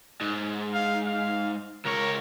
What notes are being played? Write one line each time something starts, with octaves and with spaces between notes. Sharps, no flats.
G#2
F5
F5
C#2 A#4 C#5